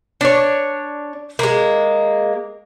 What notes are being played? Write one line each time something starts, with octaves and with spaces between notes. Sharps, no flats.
D4 C#5
G#3 A#3